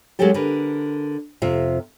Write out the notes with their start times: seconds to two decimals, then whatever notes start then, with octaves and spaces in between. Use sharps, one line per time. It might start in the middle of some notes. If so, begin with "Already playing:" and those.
0.19 F#3 G#3 A#3 C#4 G4 A4
0.34 D3 A#4 B4
1.42 F2 C3 F4 E5